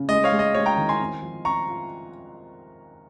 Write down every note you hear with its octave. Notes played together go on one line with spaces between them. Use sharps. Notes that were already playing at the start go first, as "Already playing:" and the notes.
Already playing: C#3
G#3 D#5
C#5 F5
G#3
D#5
G#3 C#5
G5 A#5
D#3
G#5 C6
C4
F3
C4 A#5 C#6
F4